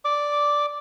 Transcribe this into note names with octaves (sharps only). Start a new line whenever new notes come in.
D5 D6